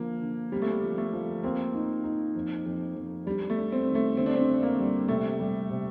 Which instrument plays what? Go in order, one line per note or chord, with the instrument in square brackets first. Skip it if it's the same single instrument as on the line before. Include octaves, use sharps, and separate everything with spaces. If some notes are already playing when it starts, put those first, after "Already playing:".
Already playing: [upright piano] D3 F3 [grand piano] A#3
[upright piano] D3
[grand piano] G3 [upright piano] C4
[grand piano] A3
G3
[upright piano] F3
[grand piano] A3
[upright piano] F3
[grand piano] A#3 [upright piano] C4
[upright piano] D#4
D#4
F2
F2
F2
[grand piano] G3 [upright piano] D4
[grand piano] A3
[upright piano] D4
[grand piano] C4
[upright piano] D#3
[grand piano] A3
[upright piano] D3 [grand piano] C4
[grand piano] D4
C4
[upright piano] D4
[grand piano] A#3
[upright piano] G3
[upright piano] C3 [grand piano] A3
[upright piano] G3
C3